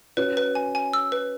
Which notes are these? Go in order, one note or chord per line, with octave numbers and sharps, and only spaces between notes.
C#4 F#4 B4
B4
G#5
G#5
E6
B4